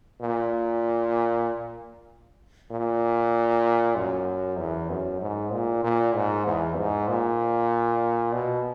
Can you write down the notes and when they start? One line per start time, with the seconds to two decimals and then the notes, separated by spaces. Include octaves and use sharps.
0.21 A#2
2.71 A#2
3.96 F#2
4.58 E2
4.90 F#2
5.21 G#2
5.53 A#2
5.84 A#2
6.15 G#2
6.46 E2
6.78 G#2
7.08 A#2
8.34 B2